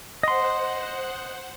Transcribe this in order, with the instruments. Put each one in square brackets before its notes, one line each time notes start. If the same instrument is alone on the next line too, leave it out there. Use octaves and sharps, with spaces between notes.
[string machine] C5 F#5 [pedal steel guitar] D#5 C6